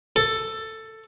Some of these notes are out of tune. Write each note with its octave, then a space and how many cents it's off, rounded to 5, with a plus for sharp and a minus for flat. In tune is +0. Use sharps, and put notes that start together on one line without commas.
A4 +10